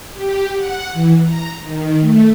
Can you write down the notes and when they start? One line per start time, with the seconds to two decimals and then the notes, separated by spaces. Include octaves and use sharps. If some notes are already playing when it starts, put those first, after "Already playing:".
0.13 G4
0.55 F#5
0.93 E3
1.23 A#5
1.62 D#3
2.01 A3